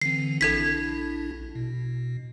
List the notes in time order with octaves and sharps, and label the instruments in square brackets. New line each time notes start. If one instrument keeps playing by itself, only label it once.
[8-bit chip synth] D3 E3 C4 [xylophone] C7
[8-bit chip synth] A#1 D4 E4 [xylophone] A4 G#6 B6
[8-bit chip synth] B2